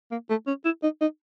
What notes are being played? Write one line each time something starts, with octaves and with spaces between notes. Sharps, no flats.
A#3
A3
C#4
E4
D#4
D#4